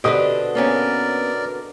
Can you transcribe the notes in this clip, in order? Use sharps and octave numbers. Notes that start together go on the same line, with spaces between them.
B2 D3 C4 G4 B4 D#5 D#6
A#3 B3 C#4 A#4 D5